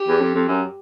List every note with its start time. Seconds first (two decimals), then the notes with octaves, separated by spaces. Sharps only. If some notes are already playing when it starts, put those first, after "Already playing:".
Already playing: G4
0.08 E2
0.21 F2
0.34 F2
0.48 F#2